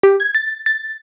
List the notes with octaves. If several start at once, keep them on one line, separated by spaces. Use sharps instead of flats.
G4
G#6
A6
A6